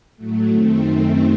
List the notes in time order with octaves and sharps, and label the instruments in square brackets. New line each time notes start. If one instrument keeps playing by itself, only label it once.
[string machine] A2 F#3 A3
F#2 D#3 A3 C4